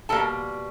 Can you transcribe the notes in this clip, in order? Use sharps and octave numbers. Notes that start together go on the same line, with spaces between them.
B2 G3 A#3 A4 A5